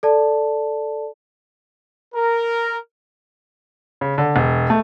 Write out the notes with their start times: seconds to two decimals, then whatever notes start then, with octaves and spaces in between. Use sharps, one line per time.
0.03 A4 D5 A5
2.14 A#4
4.01 C#3
4.18 D3
4.36 E1
4.70 A3